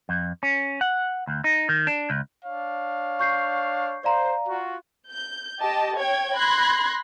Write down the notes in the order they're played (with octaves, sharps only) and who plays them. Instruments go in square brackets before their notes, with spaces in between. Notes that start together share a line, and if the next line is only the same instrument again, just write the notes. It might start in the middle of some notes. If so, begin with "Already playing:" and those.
[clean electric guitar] F2
C#4
F#5
D2
D#4
D#3
D4
C#2
[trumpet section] D4 C#5 F5
[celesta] C#6 G6 C7
[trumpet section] C5 [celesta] D5 F5 A#5
[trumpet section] F4 F#4
[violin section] G6
G4 D#5 A5
C#5 G5 G#6
B5 C6 F#6 G#6 A#6